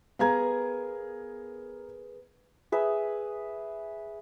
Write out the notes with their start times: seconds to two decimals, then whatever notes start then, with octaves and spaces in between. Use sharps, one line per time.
0.19 B3 G#4 A#4 F5 A#5 G#6
2.72 G#4 B4 E5